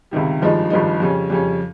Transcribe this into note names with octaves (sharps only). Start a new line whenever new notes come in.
C#2 C3 D#3 G3
G#1 G2 F3 G#3 D#4
G#1 G2 F3 G#3 D#4
F2 C#3 G3 C#4
F2 C#3 G3 C#4